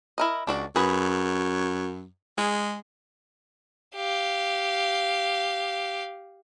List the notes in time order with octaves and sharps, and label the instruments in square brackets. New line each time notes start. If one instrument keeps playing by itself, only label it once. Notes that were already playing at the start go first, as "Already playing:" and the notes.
[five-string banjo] E4 A#4 D#5
[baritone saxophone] C#2 [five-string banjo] D4 F#4 D5
[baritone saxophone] F#2 [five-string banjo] F#4 G#4 B4
[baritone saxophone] G#3 [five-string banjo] G#4
[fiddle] G4 F5